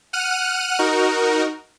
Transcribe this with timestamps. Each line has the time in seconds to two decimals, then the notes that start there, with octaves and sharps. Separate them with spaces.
0.13 F#5 F6 F#6 D#7
0.79 D#4 F#4 A#4